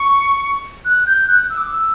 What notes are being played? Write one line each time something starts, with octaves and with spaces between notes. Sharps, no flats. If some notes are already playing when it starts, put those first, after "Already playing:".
Already playing: C#6
F#6
G6
F#6
E6
D6
E6